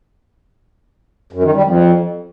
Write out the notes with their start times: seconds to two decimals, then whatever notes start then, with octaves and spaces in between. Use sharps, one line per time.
1.33 F#2
1.43 D#3
1.54 G3
1.65 F2